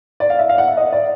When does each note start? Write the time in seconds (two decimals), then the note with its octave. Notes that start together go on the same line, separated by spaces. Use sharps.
0.20 D5
0.30 F5
0.39 E5
0.49 F5
0.58 F#5
0.67 E5
0.77 D#5
0.93 D5